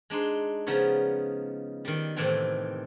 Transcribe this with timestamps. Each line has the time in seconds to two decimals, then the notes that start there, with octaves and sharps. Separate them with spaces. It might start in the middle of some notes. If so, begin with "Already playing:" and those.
0.10 G#3 D4 D#4 C6
0.67 C#3 F3 B3 D#4 C#5
1.85 D#3 G3
2.17 A2 C3 D#3 E3 C4